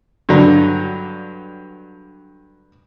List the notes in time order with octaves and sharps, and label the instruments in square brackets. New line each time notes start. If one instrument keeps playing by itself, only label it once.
[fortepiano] G2 D3 F#3